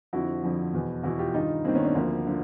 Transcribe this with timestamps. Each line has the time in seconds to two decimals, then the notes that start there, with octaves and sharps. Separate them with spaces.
0.13 F2 D3 F3 E4 F#4
0.43 F2 D3 F3
0.73 E2 B2
1.03 E2 B2 E4 F#4
1.19 F4 G4
1.34 G2 D#3 D#4 F4
1.64 G2 A#3 C4
1.68 D#3
1.74 B3 C#4
1.84 C4 D4
1.94 D2 D3 F3 A#3
2.27 D3 F3